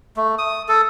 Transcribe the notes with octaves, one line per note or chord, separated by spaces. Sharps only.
A3
D#6
A4